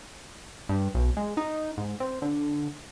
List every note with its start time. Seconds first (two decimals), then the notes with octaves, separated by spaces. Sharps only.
0.69 G2
0.95 B1
1.17 G#3
1.37 D#4
1.78 G#2
2.00 C4
2.22 D3